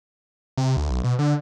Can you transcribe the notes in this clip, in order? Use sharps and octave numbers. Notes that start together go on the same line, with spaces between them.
C3
D2
B1
B2
D3